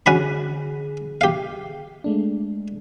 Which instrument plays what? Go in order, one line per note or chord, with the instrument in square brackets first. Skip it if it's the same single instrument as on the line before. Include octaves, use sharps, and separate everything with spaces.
[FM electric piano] D3 G#4 [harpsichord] C#4 F#4 B5
[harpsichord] G4 F5
[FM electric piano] G#3 A3 D4